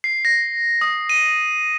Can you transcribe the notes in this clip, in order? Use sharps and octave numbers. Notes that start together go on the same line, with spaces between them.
C7
A#6
D#6
D#7